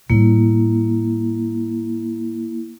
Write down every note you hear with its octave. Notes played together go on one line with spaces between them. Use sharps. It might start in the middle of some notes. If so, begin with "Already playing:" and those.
A2 G3 A#3 E4